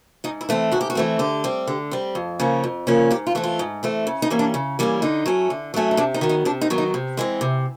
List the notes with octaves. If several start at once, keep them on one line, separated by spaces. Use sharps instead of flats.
G#2 D#4
E4
E3 A3 C4
G#2 F#4
G4
F#4
E3 A3 C4
D3 G4
G3 C4
D3
G3 C4
F2
C#3 F3 A#3 C#4
F2
C#3 F3 A#3 C#4
G#2 G4
F4
E3 A3 C4
F4
G#2
E3 A3 C4
C#3
D#4
E3 G3 A#3 C#4
D4
C#3
E3 G3 A#3 C#4
D3 D#4
F#3 A3 C#4
D3
F#3 A3 C#4
D#4
C3 D4
D#4
D#3 F#3 B3
D#4
C3 D4
D#4
D#3 F#3 B3
D#4
C3
E3 G#3 C4
C3